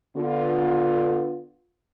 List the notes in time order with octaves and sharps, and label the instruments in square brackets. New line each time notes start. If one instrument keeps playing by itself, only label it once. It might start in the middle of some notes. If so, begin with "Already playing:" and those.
[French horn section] D3 B3 F4